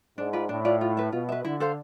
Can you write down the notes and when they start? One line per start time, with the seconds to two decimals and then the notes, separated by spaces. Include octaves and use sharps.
0.18 G#2 D4
0.33 F4 B4 D5
0.49 A2 D4
0.65 F4 B4 D5
0.81 F4
0.97 B4 E5
1.12 B2 F4
1.29 B4 E5
1.45 D3 E4
1.60 A4 C5 F5